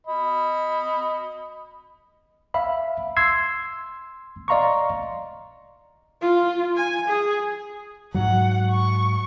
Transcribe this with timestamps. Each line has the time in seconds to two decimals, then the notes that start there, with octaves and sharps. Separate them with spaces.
0.07 D#5 B5
2.54 E5 F5 B5
3.17 C6 E6 G#6 C7
4.48 D5 D#5 F5 A#5 C6 C#6
6.21 F4
6.76 G#5
7.08 G#4
8.14 G#2 F#3 F#5
8.71 C#6